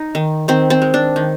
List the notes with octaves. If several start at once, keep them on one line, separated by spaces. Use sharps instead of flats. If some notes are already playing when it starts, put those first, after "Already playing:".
Already playing: D#4
D#3
D#3 C4
C4
G#3
D4
D#3